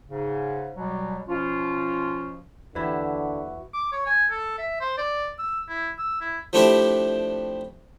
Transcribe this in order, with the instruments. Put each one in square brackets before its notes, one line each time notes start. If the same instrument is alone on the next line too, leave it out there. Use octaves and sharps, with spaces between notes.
[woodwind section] G#2 C#3
B2 F#3 G3
B2 F3 C#4 F4
[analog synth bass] D#2 [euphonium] D3 [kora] E3 E4 G4 [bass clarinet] F#4
[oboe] D6
C#5
G#5
A4
E5
C5
D5
E6
E4
E6
E4
[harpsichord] F3 A3 C4 D4 E4 G4